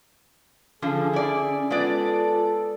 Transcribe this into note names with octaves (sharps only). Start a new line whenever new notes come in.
D3 F3 C#4 G#4
E4 D5
G#3 B3 F4 A4 D5